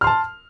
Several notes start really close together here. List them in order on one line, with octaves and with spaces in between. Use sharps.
F6 C6 A5